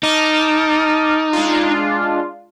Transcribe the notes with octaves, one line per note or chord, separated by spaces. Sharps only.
D#4 A5 D6 F6
G#3 D4 F4